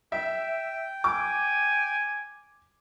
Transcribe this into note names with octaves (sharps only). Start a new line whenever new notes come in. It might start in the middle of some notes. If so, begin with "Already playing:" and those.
E5 G5
G#5 D6